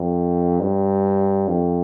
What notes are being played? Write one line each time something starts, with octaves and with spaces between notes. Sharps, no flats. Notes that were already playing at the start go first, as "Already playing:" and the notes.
Already playing: F2
G2
F2